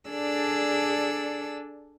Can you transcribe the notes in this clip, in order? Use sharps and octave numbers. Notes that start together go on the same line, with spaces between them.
D4 G#4 A4 D5 E6